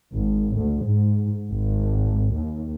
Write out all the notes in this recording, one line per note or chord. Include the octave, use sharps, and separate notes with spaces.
G#1
D2
G#2
G#1
D#2